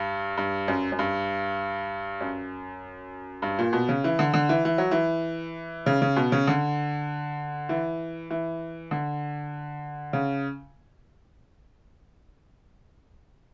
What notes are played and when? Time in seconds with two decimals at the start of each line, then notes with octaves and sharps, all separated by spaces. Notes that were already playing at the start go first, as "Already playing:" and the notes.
Already playing: G2
0.37 G2
0.68 F#2
0.92 F#2
0.99 G2
2.21 F#2
3.42 G2
3.59 A#2
3.73 B2
3.89 C#3
4.04 E3
4.19 D3
4.34 D3
4.49 E3
4.65 E3
4.78 F#3
4.91 E3
5.86 C#3
6.02 C#3
6.16 B2
6.32 C#3
6.48 D3
7.69 E3
8.31 E3
8.91 D3
10.13 C#3